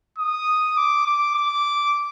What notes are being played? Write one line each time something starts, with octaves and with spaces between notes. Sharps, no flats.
D#6
D6
D6
D6